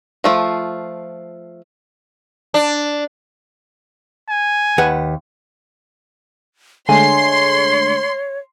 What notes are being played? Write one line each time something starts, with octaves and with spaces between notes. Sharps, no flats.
F3 A3 F4
D4
G#5
D#2 B4 F#5
D3 G#3 A3 C#5 G#5 C6